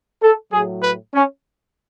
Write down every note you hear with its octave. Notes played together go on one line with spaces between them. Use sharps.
A4
A2 F#3 G#4
B4
C#4